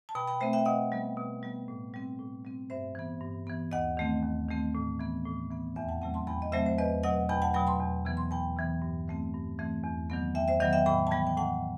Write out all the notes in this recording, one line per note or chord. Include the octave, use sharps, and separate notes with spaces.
A5
B2 G5 B5
G5 B5
A3 C4 C5 E5
E5 G5
B2 D#5 F#5
G3 B3
B2
G3 B3
A2
G3 C4
A2
G3 C4
G2 C5 E5
E3 B3
G2
E3 B3
D#2 D#5 F#5
D#3 A3 C4
D#2
D#3 A3 C4
A2
E3 B3
A2
E3 B3
E2 E5 G5
F#5 A5
C3 F#3 A3 C4 F#5 A5
A5 C6
E2 G5 B5
D#5
C3 F#3 A3 C4 C5 E5
C5
E2 B4 D#5
B2 F#3 D#5 F#5
E2 G5 B5
F#5 A5
B2 F#3 G5 B5
A5 C6
E2
C3 E3 B3
C6
E2 G5 B5
C3 E3 B3
G2
E3 A3 C4
G2
E3 A3 C4
E2
D#3 F#3 B3
E2 E5 G5
C5 E5
D#3 F#3 B3 D#5 F#5
E5 G5
A2 G5 B5
A5
E3 G3 B3 G5 B5
G5
A2 F#5 A5